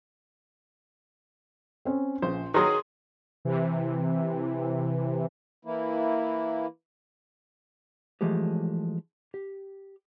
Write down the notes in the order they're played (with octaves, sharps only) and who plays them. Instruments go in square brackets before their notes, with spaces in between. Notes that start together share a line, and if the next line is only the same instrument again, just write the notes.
[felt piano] C4 C#4
[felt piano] A#1 [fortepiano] C#3 C5
[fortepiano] D#3 F#3 [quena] G#4 [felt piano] C6
[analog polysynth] C3 E3
[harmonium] E3 A#3 E4
[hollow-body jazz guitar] E3 F3 G#3 A3 G4
G4